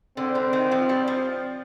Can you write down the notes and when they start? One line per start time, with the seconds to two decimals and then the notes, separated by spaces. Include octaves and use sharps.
0.17 D3 C4
0.35 D3
0.53 D#3
0.72 F3
0.89 G3
1.07 F3